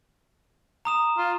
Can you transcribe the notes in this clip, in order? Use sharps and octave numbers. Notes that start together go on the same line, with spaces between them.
A#5 D#6 E7
F4